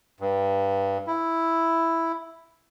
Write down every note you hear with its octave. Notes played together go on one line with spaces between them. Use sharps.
G2
E4